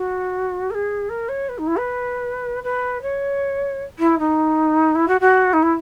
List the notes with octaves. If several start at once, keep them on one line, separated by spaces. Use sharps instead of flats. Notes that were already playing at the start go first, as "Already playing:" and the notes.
Already playing: F#4
A#4
G#4
A#4
C#5
B4
D#4
E4
B4
B4
C#5
E4
D#4
E4
F#4
F#4
D#4
E4